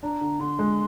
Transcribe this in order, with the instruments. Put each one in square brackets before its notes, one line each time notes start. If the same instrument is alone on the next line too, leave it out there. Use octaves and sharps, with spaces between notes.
[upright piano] D4 [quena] A#5
[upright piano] D3
[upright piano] D3 [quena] C6
[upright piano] G#3